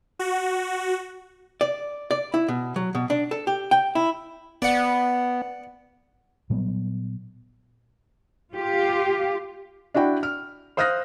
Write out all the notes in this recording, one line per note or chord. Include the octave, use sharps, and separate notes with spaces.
F#4
D5
D5
E4
B2
F#3
B2
D4
A4
G4
G5
E4
B3 D5 F#5
A#2 F#3 G3 B3
F4 G4
D4 E4 F#4 G5
F6
C5 F5 D#6 F6 F#6 A#6